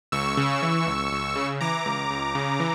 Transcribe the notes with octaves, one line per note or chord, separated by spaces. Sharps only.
C#2 C#6 E6
C#3
E3
C#2
C#2
C#3
E3 A#5 D6
C#2
C#2
C#3
E3